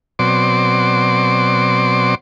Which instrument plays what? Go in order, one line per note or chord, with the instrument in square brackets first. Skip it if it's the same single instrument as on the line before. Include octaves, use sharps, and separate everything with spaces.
[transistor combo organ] B2 F#3 C4 D5 C6 D6